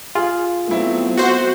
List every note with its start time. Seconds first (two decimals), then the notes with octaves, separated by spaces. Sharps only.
0.15 F4 G#4
0.67 F#3 A3 B3 C4 E4
1.17 F#4 C5